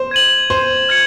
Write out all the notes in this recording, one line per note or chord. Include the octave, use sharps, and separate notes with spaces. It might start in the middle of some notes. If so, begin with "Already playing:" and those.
Already playing: C5
G#6 D#7 F#7
C5
F6 G#6 C#7